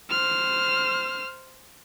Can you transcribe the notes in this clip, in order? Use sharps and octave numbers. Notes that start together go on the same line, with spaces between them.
C5 F6